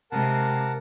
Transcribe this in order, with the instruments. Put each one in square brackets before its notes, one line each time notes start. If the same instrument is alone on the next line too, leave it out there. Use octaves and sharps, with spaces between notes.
[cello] C3 G#3 [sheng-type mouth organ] A#4 F#5 A5